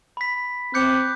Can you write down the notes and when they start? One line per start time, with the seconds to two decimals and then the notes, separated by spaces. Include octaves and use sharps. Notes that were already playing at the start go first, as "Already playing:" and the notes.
0.17 B5 B6
0.74 C4 D6 F#6 G6 C#7